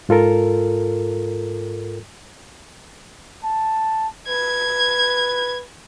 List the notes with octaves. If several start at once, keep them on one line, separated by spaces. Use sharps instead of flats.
G#2 F4 A4 A#4
A5
B4 G#6